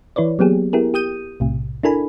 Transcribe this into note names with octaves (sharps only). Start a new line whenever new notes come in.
E3 E4 B4 C#5 D5
F#3 A#3 B3 G4 G#4
B3 E4 G4 G#4 A#4
G4 D#6 G6 D#7
B1 A2 C3
D4 E4 A4 A#4 G#5 B5